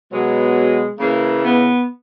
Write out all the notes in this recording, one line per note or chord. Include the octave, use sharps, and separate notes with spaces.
B2 F#3 G#3
C#3 E3 A#3
B3